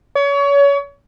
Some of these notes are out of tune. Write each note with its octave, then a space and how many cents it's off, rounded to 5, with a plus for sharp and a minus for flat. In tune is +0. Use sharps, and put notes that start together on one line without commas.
C#5 +30